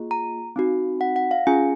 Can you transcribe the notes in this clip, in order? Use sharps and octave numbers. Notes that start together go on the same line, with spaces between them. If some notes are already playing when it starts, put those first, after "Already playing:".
Already playing: A#3 F4 G#4
A#5
C4 D#4 F#4
F#5
F#5
F5
C#4 F4 G#4 G#5